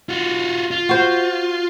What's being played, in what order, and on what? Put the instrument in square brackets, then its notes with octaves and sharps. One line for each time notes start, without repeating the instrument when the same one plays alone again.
[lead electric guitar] F4 F#4
F4
[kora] F#4 C5